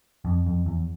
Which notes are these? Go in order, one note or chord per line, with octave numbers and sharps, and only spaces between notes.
F2
F2
E2